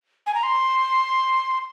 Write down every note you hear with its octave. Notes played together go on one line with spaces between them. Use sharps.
G#5
A#5
C6